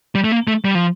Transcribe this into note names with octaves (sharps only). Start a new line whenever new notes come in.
G3
A3
A#3
A3
G3
F3